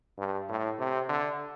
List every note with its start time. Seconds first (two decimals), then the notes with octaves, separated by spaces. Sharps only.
0.18 G2
0.49 A2
0.79 C3
1.09 D3